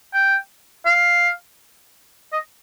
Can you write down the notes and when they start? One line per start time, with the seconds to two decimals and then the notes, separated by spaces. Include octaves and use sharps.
0.13 G5
0.85 F5
2.32 D#5